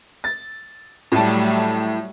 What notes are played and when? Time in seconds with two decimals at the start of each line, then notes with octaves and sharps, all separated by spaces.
0.24 A6
1.12 A2 F#3 G3 A3 A5